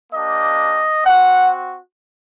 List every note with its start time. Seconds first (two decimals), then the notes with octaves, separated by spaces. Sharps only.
0.12 A#3 D4 G4 D#5
1.04 C4 F#4 F#5